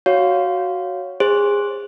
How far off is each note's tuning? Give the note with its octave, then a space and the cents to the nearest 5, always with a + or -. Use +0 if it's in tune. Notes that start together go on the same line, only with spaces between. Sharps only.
F#4 +0 C#5 +5 F5 +0
G#4 -25 C5 +15